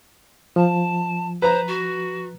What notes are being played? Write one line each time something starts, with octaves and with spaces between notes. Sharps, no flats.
F3 A5
B4 C5 A#5
F#4